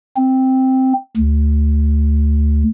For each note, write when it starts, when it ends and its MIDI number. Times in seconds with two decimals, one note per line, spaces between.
0.16 0.93 60
1.17 2.64 38